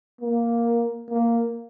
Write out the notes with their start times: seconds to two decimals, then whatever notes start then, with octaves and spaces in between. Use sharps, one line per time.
0.21 A#3
1.10 A#3